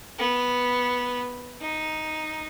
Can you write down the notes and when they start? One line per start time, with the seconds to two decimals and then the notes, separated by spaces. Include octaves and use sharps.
0.19 B3
1.62 D#4